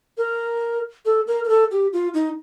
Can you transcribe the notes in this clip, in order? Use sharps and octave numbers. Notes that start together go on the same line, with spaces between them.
A#4
A4
A#4
A#4
A4
G4
F4
D#4